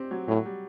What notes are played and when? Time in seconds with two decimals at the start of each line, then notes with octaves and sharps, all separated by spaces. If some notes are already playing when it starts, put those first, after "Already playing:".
Already playing: C4 G4
0.11 F#3
0.28 A2 F#3
0.46 G3